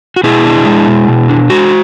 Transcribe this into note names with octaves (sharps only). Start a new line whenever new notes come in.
F#4
B2 E4 G#4
D4
G#3
B2
B2
D4
G#3 F#4